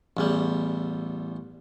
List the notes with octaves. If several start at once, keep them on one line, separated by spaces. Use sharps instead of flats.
A1 E2 G3